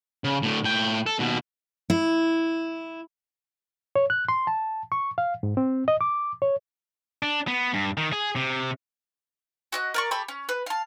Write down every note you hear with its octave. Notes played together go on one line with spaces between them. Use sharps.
C#3
A2 D3
A2 G5
A4
D#2 B2
E4
C#5
F#6
C6
A5
C#6
F5
G#2
C4
D#5
D6
C#5
D4
B3
G2
D#3
G#4
C3
F#4 D#5 F#6
A#4 D5 C#6
G4 A4 B5 C#6
C#4
B4
F5 A5